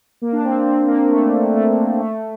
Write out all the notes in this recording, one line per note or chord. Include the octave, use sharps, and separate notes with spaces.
A#3
D4
C4
C4
A#3
A3
A3
A3